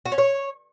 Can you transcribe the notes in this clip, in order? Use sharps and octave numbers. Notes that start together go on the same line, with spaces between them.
F#4
C#4
C#5